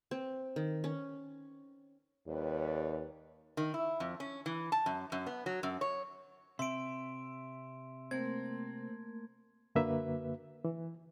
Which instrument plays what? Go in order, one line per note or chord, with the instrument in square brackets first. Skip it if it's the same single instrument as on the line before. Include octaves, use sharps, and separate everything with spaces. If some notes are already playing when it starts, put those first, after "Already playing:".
[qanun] C4
D#3
C#4
[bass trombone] D#2 [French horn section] G3 B4 C#5
[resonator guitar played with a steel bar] D#3
E4
F2
C#4
E3
A5
F#2
F#2
B3
F#3
F#2
C#5
[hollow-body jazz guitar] C3 [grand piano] E5 [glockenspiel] C6 D7
[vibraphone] A3 A#3 A#4 [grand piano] C4 [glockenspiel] G#6
[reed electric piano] F#2 D3 A#3 F#4 B4 E5
E3